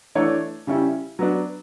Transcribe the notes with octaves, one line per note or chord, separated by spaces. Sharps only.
E3 A3 D4 A4 C#5
C#3 G3 C#4 E4
F#3 B3 D4